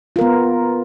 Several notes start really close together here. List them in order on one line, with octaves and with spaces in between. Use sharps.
F4 A#4 B3